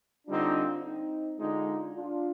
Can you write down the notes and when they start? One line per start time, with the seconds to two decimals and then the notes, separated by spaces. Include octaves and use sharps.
0.28 D3 G3 C4 D4 D#4 F4
0.83 C4 D#4
1.39 D3 G#3 D4 D#4 F4
1.95 D4 F4